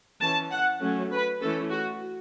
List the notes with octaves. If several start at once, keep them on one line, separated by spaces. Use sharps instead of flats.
E3 C#4 A5
F#5
F#3 A3 C#4
B4
E3 A3 C#4 A4
F#4